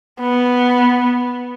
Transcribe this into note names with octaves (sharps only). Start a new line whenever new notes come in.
B3